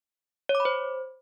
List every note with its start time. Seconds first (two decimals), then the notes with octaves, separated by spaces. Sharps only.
0.49 C#5
0.55 D6
0.60 B5
0.65 C5